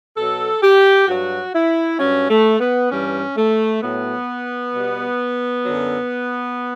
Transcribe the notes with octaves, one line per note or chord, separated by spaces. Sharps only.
B2 F#3 A4
G4
G2 F#3 F#4
E4
G2 F#3 C#4
A3
B3
G2 E3 G3 C#4
A3
A2 F#3 B3
B2 G3
F#2 D3 F#3